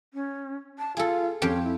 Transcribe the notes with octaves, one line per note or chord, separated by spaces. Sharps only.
C#4
A5
F4 G#4 A4
F2 C#4 G4 G5
E4